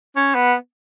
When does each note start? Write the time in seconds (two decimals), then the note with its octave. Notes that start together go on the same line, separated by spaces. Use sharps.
0.16 C#4
0.34 B3